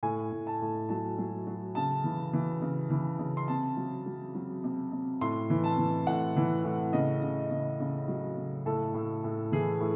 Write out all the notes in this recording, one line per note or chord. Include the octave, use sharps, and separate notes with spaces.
A2 G#5
A2
A5
A2
F#3 A5
F#3
F#3
C#3 A5
E3
E3
C#3
E3
C#3
C6
C3 A5
F#3
F#3
F#3
C3
C3
A2 C6
E3
A5
E3
A2 F#5
E3
A2
C#3 D#5
C#3
C#3
C#3
F#3
C#3
A2 A4
A2
A2
E3 G#4
A2